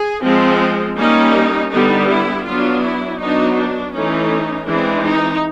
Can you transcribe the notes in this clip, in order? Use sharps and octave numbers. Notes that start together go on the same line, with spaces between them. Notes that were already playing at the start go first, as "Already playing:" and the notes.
Already playing: G#4
F3 G#3 C4
G3 A#3 C#4 D#4
D3 G3 B3 D#4
E4
F#3 B3 D4 F4
E4
F#3 B3 D4 D#4
D4
E3 A3 C#4 D#4
E3 G#3 C4 D4
D#4